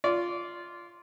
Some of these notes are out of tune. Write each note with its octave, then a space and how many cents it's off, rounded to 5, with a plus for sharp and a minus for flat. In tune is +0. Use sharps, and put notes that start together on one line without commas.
F4 -5 D5 -25